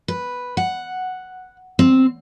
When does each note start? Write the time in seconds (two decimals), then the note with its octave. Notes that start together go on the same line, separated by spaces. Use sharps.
0.08 B4
0.57 F#5
1.79 C4